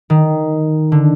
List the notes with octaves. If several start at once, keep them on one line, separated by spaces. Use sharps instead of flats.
D#3
D3